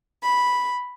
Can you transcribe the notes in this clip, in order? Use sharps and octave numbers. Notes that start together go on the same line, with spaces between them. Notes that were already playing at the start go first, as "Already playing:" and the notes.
B5